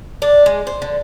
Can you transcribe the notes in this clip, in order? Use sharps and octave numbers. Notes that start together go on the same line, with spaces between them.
D4
G#3
C5
D3